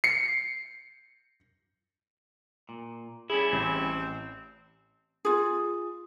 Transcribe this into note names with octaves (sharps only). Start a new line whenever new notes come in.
C7 C#7
A#2
G3 C#4 E4 G#4
A1 C4
F4 G#4